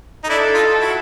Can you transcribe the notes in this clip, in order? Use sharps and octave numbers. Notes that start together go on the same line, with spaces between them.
D#4
D4 E4 A4
D#4 F4
E4 F#4